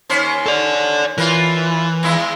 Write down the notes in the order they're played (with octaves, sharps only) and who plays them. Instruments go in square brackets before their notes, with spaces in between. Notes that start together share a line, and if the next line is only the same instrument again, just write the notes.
[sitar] D#2 C#4 C5
[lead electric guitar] A4 D5
[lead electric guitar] E3 [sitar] F4 A#4
[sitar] E2 G#3 E4